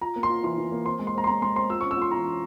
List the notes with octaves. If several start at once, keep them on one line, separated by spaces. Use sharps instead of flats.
F4 A#5
A#3
C6
F4
E3 C6
E3
A#3
C4 C6
G#3
C6
C4 A#5
C6
G#3 A#5
G#3 C6
C4 C6
F4 E6
C#6
C#4
E6
F4 C6
E3 A#5
C#4